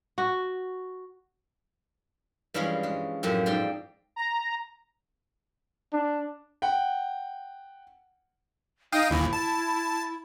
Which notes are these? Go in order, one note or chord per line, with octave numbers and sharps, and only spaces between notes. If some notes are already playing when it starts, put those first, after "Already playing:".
F#4
G2 E3 F3 G#3 C#4
G#3
F#2 A2 F3 C4
G#2 D5 G5 C6
A#5
D4
F#5 G5
D#4 F5 G5 D#6
G1 D#2 A#2 E4
A5